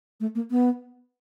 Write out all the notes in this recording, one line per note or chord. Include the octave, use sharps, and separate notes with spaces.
A3
A#3
B3